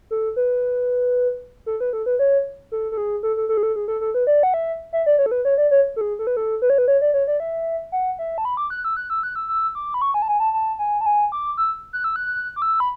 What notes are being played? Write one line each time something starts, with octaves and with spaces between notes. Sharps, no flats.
A4
B4
A4
B4
A4
B4
C#5
A4
A4
G#4
A4
A4
A4
G#4
A4
G#4
A4
A4
B4
D5
F#5
E5
E5
D5
C#5
A4
B4
C#5
D5
C#5
A4
G#4
A4
B4
A4
B4
C#5
B4
C#5
D5
C#5
D5
E5
F#5
E5
A5
B5
D6
F#6
E6
F#6
E6
F#6
E6
E6
D6
B5
C#6
G#5
A5
G#5
A5
A5
G#5
A5
G#5
D6
E6
F#6
E6
F#6
D6
E6
B5